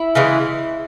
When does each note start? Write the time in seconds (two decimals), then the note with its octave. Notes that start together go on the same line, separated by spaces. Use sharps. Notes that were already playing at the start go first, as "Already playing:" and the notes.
Already playing: E4
0.15 C#3 E3 G#3